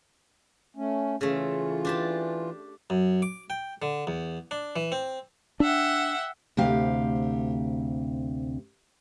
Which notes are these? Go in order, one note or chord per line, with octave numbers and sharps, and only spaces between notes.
A3 C#4
C#3 E3 A3 F4
D4 G4 A5
F#2
D6
G5
D3
E2
D4
E3
C4
D4 E5 F#5 G5
D2 C3 G4 F5